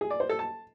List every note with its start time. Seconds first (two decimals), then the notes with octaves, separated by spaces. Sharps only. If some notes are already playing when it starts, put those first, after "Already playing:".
0.01 G#4
0.10 D5
0.20 C5
0.29 A4
0.39 A5